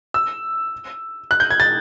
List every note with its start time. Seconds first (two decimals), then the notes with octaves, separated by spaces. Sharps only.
0.14 E6
1.31 F#6
1.40 G6
1.51 G#6
1.60 A6